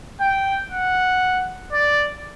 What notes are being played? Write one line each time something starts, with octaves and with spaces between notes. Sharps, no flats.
G5
F#5
D5